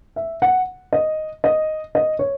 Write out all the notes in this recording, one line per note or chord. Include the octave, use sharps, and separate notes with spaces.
E5
F#5
D#5
D#5
D#5
C#5